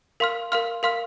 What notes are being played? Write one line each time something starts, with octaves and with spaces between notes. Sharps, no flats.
A#4 F5 C6 F6
A#4 F5 C6 F6
A#4 F5 C6 F6